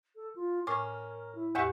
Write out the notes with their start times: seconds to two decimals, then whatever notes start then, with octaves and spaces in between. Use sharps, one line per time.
0.16 A4
0.36 F4
0.67 A2 C#4 A#4 D6
1.35 E4
1.55 E2 A2 G4 B4 E5 F#5